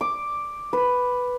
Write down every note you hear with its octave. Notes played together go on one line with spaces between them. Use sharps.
D6
B4